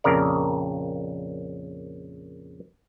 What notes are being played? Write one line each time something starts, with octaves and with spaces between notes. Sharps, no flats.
A#1 F2 C#3 A#4 D5